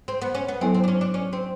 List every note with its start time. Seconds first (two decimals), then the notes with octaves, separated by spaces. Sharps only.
0.08 C4
0.22 B3
0.35 C#4
0.48 B3
0.61 F#3 B3 C4 E4 A4
0.74 C4
0.84 D4
0.88 C#4
1.01 D4
1.14 C#4
1.33 C4